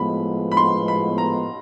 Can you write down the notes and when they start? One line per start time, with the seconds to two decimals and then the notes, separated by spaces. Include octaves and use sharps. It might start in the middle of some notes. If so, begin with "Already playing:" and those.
Already playing: A2 F3 G#3 B3 B5
0.52 B5
0.57 C6
0.88 B5
1.18 A#5